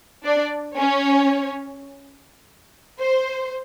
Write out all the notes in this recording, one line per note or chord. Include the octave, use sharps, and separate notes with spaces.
D4 D5
C#4 C#5
C5